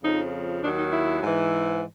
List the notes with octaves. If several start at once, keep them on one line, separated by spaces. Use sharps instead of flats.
F2 C#3 F3 D#4
D#2 D#3 F#3 D4
D#4
E4
G#2 E3